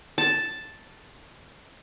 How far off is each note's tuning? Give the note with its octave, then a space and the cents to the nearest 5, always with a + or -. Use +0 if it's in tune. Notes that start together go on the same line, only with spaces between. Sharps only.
A5 +0